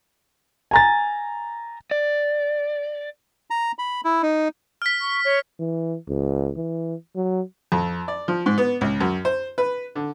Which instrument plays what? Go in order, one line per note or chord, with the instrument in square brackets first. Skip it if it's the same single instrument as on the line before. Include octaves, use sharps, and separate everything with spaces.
[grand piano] G#5 A#5 A6
[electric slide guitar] D5
[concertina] A#5
B5
E4
D#4
[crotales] F6 B6
[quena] C#6
C#5
[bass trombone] E3
C#2
E3
F#3
[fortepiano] F2
D5
F3
G#2
B3
C#2
F#2
C5
B4
D3